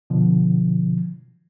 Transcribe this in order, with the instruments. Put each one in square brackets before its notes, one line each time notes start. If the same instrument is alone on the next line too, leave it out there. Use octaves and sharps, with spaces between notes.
[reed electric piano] B2 D3 F3